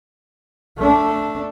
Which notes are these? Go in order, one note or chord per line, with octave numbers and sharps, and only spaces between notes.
A3 D4